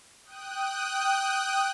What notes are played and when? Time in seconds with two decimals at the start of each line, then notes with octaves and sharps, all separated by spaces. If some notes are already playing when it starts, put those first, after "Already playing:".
0.24 G5 D#6 F#6